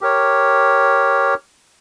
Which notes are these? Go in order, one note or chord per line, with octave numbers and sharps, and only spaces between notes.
G4 A#4 C#5